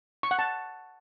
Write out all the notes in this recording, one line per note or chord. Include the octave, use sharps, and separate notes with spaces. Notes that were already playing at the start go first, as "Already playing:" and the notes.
C#6
F#5
A5